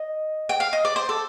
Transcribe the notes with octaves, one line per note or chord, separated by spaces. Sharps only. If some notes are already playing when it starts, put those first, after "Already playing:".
Already playing: D#5
G5
F5
D#5
D5
C5
A4